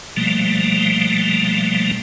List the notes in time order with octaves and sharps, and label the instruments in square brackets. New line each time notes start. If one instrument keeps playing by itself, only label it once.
[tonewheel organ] B2 F3 G3 A3 A#3